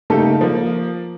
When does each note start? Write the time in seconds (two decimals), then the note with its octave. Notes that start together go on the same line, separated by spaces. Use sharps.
0.10 C#3 A3 A#3 D#4 G4 A4
0.41 F3 A#3